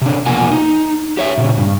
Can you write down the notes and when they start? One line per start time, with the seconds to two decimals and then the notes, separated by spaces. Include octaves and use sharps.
0.01 C3 D4
0.26 E2 B2 F3 A#3 F#4 G#5
0.52 D#4
1.17 G4 C#5 E5
1.37 A#2 C#3
1.58 G2